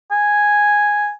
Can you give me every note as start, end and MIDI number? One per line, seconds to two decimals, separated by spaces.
0.11 1.11 80